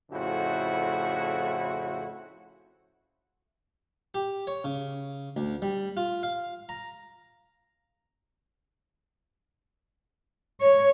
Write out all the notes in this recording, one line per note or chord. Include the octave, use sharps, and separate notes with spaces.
F2 A2 C#3 E4 F#4 C5
G4
C#5
C#3
D2
G3
F4
F5
A#5
C#5